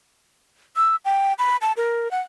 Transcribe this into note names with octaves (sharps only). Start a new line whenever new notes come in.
E6
G5
B5
A5
A#4
F#5